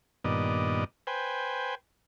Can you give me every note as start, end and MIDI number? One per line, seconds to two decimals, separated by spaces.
0.25 0.84 43
0.25 0.84 46
0.25 0.84 51
0.25 0.84 59
0.25 0.84 74
0.25 0.84 75
1.07 1.75 71
1.07 1.75 72
1.07 1.75 79
1.07 1.75 80